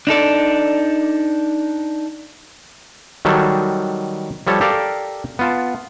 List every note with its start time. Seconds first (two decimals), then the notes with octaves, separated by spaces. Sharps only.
0.07 D4 D#4 A4 D5
3.25 D#3 F#3 G3 A4
4.47 F3 G3 A4 C#5
4.61 G4 A4 A#4 D5 F5
5.39 B3 F4 A5